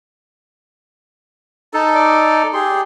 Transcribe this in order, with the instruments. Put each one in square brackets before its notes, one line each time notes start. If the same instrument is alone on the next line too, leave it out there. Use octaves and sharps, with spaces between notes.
[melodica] D#4 A4 [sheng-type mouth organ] A5
[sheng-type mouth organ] D5
[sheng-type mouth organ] G4 G#4 [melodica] C6